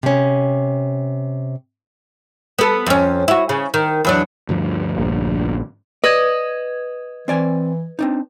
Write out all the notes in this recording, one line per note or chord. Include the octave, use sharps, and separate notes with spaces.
C3 C#4
B3 A4
F2 C#4
E4 F#4
C#3
D#3
E2 F#3 D4
D2 G2 F3
A#1
B4 D5 D#5 G#6
E3 C4 D5 G#5
C4 D4 D#4